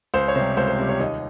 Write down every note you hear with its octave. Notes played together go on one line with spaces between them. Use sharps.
C#2 C5
C#5
C3 G3 C5
C#2 C5
C5
C3 G3 C5
C#5
D#2 D#5